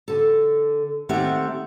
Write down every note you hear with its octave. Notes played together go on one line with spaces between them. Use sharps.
D3 A4
D#3 A3 C4 G4 E5 F#5